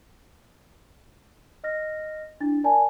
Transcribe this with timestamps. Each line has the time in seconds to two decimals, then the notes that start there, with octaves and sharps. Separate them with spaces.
1.64 D#5 F6 A#6
2.40 D4 E4 A6
2.64 A#4 D5 G#5 A5